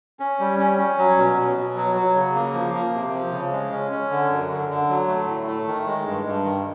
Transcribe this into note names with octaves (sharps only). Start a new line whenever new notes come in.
C#4
G3
C#4
C#4
F#3
B2
B2
B2
F#3
F#3
C#3
A#3
F3
A#3
C3
F3
C#3
G#3
C#4
C#4
D3
F#2
D3
D3
F#3
A3
A2
A3
D#3
G#3
G2
G2
D#3